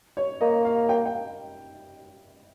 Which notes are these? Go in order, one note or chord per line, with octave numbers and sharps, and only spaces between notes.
C#5
A#3 D#5
F5
G5
G5